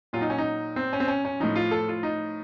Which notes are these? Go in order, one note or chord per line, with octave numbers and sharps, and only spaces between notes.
A#2 F#3 F4
D#4
C#4
D#4
C4
C#4
C4
C#4
C#4
A2 F3 D#4
F4
A4
F4
D#4